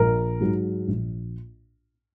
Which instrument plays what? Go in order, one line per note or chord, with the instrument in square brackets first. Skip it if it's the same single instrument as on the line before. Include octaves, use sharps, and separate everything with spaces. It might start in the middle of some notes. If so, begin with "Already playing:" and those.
Already playing: [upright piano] A#1 A#4
G#2 F#3
A#1